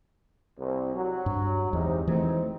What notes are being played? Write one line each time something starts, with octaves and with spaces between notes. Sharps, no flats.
C2
F#3
G2
E2 G#2 C3 D#4
G#1 E3 A3 C4 D#4